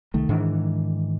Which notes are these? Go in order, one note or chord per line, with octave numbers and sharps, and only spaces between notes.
C2 D#3 A3
G#2 D#3 E3 D4